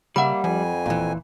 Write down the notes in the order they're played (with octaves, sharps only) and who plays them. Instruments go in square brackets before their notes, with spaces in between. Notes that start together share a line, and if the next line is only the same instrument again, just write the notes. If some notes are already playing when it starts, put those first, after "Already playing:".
[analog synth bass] C#3 [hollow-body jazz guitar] G3 E5 [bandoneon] A#3 [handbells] F#5 B5
[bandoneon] F2 G#5 [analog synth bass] F3
[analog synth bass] E1 [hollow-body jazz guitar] A#2 E3